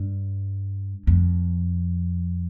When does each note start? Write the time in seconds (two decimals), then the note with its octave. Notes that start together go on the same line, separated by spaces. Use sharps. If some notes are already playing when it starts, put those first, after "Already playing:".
Already playing: G2
1.07 F2